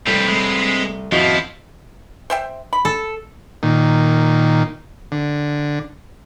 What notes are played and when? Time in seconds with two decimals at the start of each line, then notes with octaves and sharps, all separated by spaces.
0.07 C2 D#3 G3 A3 C4 B4
0.28 G#3
1.12 F2 F3 E4 F#4 D#5 F5
2.30 C5 E5 G5
2.73 B5
2.85 A4
3.63 A#2 D#3
5.12 D3